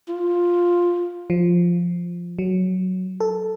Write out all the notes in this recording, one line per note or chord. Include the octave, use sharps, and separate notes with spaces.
F4
F3
F#3
A4